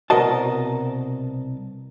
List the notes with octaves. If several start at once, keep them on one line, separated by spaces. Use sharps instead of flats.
C2 B2 F#4 A#4 D#5 A5